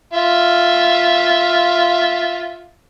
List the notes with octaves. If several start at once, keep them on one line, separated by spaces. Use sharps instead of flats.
F4 E5